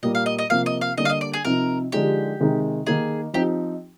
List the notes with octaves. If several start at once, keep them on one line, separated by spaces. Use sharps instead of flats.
A#2 G3 A#3 D#5
F5
D#5
D#5
C3 F3 A#3 F5
D#5
F5
D3 G3 A#3 D4 D#5
F5
D#5
D5
G#4
C3 F3 C4 D#4 A#4
D3 F3 G#3 D#4 G4
C3 D#3 G#3 D#4
D#3 A#3 D#4 G#4
F3 C4 D#4 G4